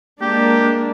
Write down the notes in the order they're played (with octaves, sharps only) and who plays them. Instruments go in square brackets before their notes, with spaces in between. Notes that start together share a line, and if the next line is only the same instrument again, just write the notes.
[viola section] G#3 A#3 D4 [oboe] G4